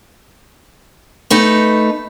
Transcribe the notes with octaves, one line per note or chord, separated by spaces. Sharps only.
A3 D#4 B4